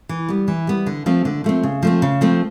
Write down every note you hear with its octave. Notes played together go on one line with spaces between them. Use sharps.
E3
G3 B3
E3
G3 B3
D3
F3 A3 C4
D3
F3 A3 C4
C#3
F3 A3 C4
C#3
F3 A3 C4